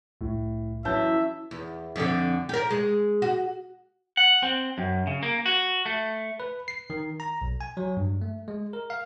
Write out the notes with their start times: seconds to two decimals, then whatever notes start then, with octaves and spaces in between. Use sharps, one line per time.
0.21 C2 A2
0.85 E3 F#3 C#4 E5 A5 G6
1.51 E2
1.96 F2 D3
2.49 G4 A#4
2.70 G#3
3.22 F#4
4.17 F#5
4.43 C4
4.78 F#2
5.07 C#3
5.23 A#3
5.46 F#4
5.86 A3
6.40 B4
6.68 C7
6.90 D#3
7.20 A#5
7.41 B1
7.61 G#5
7.77 F#3
7.97 G2
8.22 A3
8.48 G#3
8.73 A#4
8.90 F5